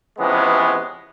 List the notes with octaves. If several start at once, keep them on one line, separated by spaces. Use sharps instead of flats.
C3 E3 F3 G#3 B3 C#4